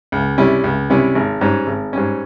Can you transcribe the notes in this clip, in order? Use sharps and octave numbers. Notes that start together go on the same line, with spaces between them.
C#2
C3 G3 C#4 E4
C#2
C3 G3 C#4 E4
G#1
G#2 G3 C#4
G#1
G#2 G3 C#4